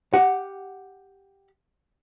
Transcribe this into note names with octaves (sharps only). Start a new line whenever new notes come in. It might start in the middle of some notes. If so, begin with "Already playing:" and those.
G4 F#5